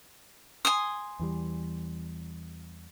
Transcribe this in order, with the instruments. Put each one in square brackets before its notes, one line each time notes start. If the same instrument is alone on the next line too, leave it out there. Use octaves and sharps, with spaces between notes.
[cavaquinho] G#5 C6 D#6
[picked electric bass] E2 E3 G3